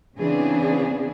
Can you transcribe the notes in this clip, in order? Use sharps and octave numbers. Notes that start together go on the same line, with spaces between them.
C#3 E3 B3 C4 D4 G#4